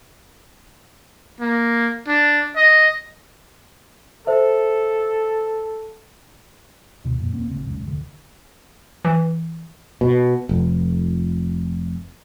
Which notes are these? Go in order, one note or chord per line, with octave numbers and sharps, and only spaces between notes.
A#3
D4
D#5
A4 C5 E5
D2 B2 D#3
F2 A#2
D#1 A#3 C4 C#4
G#1 A2 C#3 C4
D#1 B1 G#2 C#3
F1 D2 D3
E3
B2
F1